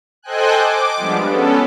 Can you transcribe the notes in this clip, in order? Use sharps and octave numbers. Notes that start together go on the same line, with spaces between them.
A4 C5 D#5 G5 G#5 F#6
D6
F3 G3 G#3 B3 D4
B3 C#4 A4